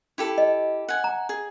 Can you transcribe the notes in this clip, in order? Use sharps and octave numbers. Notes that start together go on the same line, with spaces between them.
E4 G4 A4
D#5
F#5 G#5
A#5
G#4